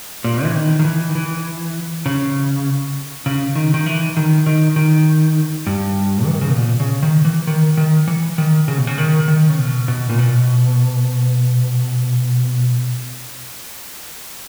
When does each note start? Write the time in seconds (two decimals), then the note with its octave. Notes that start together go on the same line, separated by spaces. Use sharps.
0.24 A#2
0.44 E3
0.55 D#3
0.79 D#3
0.85 E3
1.09 D#3
1.15 E3
2.06 C#3
3.26 C#3
3.55 D#3
3.74 D#3
3.86 E3
4.17 D#3
4.46 D#3
4.76 D#3
5.67 G2
6.26 E3
6.34 D#3
6.41 C#3
6.49 B2
6.57 A#2
6.80 C#3
7.03 D#3
7.25 E3
7.47 D#3
7.77 D#3
8.08 E3
8.38 D#3
8.68 C#3
8.78 B2
8.87 C#3
8.98 D#3
9.28 D#3
9.49 C#3
9.58 B2
9.88 B2
10.10 A#2
10.19 B2